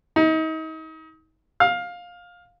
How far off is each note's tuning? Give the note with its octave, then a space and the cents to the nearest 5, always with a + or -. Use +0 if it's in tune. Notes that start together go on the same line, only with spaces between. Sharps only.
D#4 +35
F5 +15